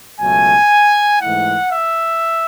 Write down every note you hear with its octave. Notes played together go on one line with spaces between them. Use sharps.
C#2 B2 F#3 A3 G#5
G#2 E3 A3 E4 F#5
E5